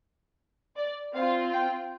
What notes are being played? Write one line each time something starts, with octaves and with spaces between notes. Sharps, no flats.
D5
C4 F4 F5
G5